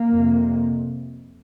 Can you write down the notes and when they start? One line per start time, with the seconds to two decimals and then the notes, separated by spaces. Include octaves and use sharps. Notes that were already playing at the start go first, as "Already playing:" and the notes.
Already playing: A#3
0.10 F2 C3